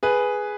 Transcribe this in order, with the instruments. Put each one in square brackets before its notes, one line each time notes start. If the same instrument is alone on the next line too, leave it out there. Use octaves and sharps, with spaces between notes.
[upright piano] G#4 B4